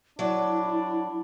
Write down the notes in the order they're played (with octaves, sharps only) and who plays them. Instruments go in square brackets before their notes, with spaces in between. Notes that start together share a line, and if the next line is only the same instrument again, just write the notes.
[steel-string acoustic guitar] F#3 D5 [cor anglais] D4 [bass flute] E4